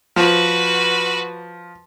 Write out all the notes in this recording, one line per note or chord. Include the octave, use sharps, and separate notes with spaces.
F3 F#4 B4